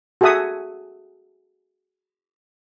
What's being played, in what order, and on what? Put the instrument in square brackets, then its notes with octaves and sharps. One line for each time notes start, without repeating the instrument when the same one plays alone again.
[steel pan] F#4 G#4 A4 E5 F#5 D#6